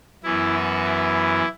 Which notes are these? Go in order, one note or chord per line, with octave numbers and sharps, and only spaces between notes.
F#2 E3 B3 E4
F#4
E4